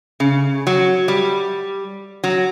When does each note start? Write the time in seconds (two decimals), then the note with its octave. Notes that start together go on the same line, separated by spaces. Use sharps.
0.20 C#3
0.67 F#3
1.08 G3
2.24 F#3